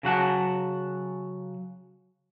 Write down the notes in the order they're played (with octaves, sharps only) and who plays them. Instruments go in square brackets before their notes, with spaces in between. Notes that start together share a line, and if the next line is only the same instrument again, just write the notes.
[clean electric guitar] C#3 F#3 F#5 A5